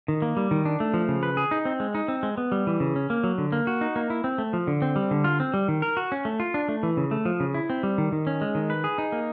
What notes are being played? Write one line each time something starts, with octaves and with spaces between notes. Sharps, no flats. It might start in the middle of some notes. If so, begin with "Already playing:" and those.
D#3
A#3
G3
D#3
D4
A3
F3
C#3
B4
G#4
D#4
C4
G#3
D#4
C4
G#3
B3
G3
E3
C#3
C#4
A#3
F#3
D3
A#3
F#4
D#4
A#3
E4
C4
A3
F3
D3
C4
G3
D3
F4
C4
G3
D#3
A#4
F#4
C#4
A3
F4
D4
A3
E3
C#3
A3
F3
C#3
E4
C4
G3
D#3
D#3
C#4
G#3
D#3
B4
G#4
D#4
A#3